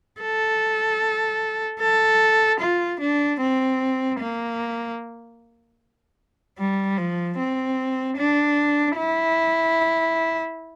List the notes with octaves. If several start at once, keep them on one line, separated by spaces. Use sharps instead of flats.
A4
A4
F4
D4
C4
A#3
G3
F3
C4
D4
E4